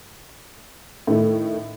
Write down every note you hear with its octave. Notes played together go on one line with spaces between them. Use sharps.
A2 D#3 A3